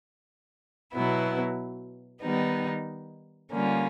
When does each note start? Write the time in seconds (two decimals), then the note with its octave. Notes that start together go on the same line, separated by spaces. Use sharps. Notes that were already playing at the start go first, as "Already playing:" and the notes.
0.94 B2 F#3 B3 E4
2.22 D#3 G3 B3 D#4
3.51 D3 G3 A#3 C#4 F4